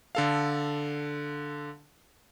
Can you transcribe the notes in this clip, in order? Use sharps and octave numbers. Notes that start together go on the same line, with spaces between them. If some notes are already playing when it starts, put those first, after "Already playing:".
D3 A4 F5